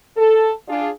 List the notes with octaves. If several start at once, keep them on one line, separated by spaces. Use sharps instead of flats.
A4
D4 F4 G#4